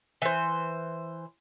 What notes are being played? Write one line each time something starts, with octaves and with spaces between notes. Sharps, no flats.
E3 C5